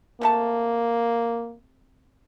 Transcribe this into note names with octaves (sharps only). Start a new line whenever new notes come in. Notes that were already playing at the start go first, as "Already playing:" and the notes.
C3 A3 A#3 A5